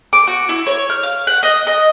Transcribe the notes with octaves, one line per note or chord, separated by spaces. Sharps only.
D6
F#4
E4
C#5
F6
F5
F#5
D#5
D#5